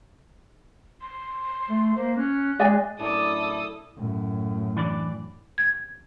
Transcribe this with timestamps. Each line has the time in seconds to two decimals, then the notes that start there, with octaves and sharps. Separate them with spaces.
1.01 C6
1.68 A3
1.96 A#3 C5
2.17 C#4 F#6
2.59 G#3 D5 D#5 G#5
2.99 F#2 A2 D4 E4 A4 A5 D6 D#6
3.97 F#2 A2
4.77 E3 D4 D5
5.58 G#6